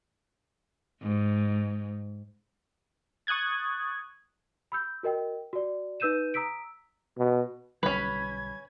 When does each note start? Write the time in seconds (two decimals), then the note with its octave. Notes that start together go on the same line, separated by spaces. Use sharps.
1.03 G#2
3.27 C#6 D#6 F#6 G#6 A6
4.72 B5 E6 G6
5.03 F#4 A#4 D#5 G5
5.53 F#4 D5
6.00 D#4 B4 E6 G6 D#7 E7
6.34 A#5 D#6 E6 B6 D7
7.18 B2
7.83 B1 D3 G3 C#4 B4 B5 G#6